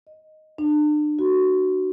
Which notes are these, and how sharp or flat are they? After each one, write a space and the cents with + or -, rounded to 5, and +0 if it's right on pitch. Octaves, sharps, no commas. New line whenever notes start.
D#5 +0
D4 +35
F#4 +10